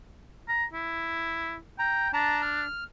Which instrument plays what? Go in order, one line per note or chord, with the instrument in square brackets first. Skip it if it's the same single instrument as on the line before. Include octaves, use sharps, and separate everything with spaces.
[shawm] A#5
E4
[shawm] G5 [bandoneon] A#5
[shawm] D4 [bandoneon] A5 A#5
[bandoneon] F6